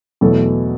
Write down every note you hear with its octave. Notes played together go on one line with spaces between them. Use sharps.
E2 B2 F#3 A3 A4